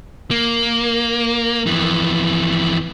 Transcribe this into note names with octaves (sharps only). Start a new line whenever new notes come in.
A#3
F2 E3